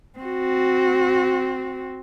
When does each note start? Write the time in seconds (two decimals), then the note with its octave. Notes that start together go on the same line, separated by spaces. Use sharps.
0.19 C4 F#4